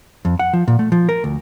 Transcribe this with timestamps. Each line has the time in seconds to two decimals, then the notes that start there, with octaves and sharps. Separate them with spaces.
0.25 F2
0.39 F#5
0.53 F3
0.68 A#2
0.79 A3
0.92 F3
1.09 A#4
1.24 D2